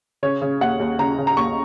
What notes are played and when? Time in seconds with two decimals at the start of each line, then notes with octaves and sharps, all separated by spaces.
0.23 C#3 C#5
0.42 C#3
0.61 D#2 F#5
0.80 D#2
0.99 C#3 A#5
1.18 C#3
1.27 A#5
1.37 D#2 C#6